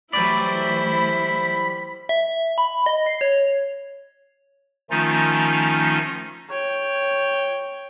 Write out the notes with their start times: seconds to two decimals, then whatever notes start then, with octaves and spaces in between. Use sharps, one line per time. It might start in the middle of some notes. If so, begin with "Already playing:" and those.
0.13 E3 F#3 G3 A3 E4 C5 D5 B5
2.09 E5
2.58 B5
2.86 D#5
3.06 C7
3.21 C#5
4.90 D#3 F3 A3 C#4 D#4 F4
6.49 C#5 G5